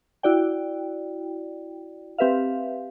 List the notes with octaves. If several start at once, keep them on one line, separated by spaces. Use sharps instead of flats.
E4 F#4 D5 G5
C4 G4 B4 E5 F5